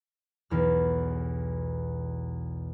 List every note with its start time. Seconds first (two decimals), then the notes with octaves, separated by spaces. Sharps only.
0.50 B1 E2 F6